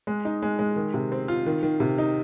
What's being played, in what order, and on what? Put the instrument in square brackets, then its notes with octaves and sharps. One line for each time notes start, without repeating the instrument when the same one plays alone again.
[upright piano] G#3
D#4
G#3
G#3
D#3
C3
C4
F4
D#3
D#3
C3
D#4